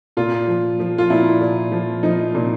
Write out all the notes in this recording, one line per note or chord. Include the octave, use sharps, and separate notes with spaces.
A#2 F4
F3
F3
F4
A#2 E4
A#2
F3
F3 D#4
A#2